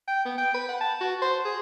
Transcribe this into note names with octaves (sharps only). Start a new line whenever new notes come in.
G5
B3
G5
B4
F#5
A5
F#4
C5
G#4